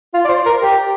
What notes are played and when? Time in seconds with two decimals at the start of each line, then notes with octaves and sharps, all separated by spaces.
0.14 F4
0.25 D5
0.29 C5
0.46 A#4
0.61 G4